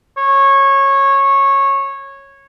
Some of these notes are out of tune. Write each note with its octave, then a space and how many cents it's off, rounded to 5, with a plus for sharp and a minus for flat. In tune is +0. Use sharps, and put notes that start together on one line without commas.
C#5 -15